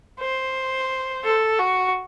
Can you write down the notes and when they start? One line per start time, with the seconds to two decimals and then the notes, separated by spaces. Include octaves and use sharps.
0.20 C5
1.24 A4
1.59 F#4